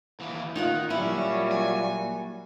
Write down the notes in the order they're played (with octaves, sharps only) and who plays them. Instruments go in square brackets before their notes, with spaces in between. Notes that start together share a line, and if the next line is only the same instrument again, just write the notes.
[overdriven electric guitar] D#2 E3
[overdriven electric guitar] D#3 [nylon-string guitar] D#4 F4 F#5
[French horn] A#2 [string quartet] F#3 G3 F#4 [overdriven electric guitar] C#4 [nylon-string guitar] E4
[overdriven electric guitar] G#5